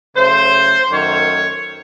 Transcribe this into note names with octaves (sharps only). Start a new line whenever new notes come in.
C#3 F#3 A3 C5
F#2 D#3 A3 C#5